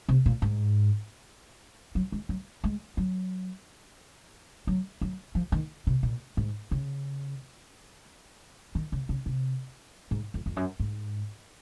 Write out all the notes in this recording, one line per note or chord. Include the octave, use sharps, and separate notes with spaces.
C3
A#2
G#2
F#3
G#3
F#3
G#3
F#3
F#3
F#3
F3
D#3
C3
A#2
G#2
C#3
D#3
C#3
C#3
C3
G#2
F2
F2
F#2
G#2